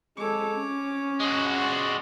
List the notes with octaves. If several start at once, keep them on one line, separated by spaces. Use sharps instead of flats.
G#3 A4 C#5 D6
C#4
G#3 F#4
D5 C6